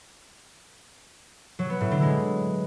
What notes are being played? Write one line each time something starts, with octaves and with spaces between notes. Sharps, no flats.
F#3
B3
A2
D3
G#3